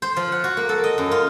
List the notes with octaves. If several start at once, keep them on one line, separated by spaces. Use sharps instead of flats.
C5
F3
F#5
F#4
A#3
A4
D#5
F#2
F4